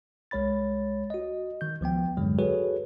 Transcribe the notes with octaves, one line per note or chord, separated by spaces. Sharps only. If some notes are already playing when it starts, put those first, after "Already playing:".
C2 G#3 C#5 B5 A6
F#4 D#5
D#3 G6
C#2 F3 B3 G5
E2 G2 D3 F#3 G#3
F#4 G#4 A4 B4 C#5